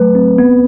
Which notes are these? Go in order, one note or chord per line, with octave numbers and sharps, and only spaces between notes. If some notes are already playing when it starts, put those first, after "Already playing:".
Already playing: F#3 A3 B4
C4
B3